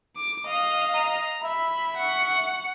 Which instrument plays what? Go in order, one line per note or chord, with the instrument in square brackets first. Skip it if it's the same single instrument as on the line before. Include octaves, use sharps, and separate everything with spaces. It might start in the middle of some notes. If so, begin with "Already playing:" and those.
[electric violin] D6
D#5 F5
[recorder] A#5
[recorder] E5 [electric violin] B5
[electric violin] F#5 C#6